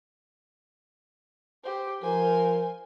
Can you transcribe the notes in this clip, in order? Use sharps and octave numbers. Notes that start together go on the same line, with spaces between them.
G4 C5
F3 A#4 C5 G#5